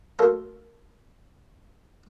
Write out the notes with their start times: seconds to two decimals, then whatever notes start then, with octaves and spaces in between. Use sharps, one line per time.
0.19 F#3 A3 A#3 A4 A#4 C5